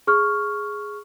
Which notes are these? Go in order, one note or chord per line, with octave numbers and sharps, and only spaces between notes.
G#4 C#6 F6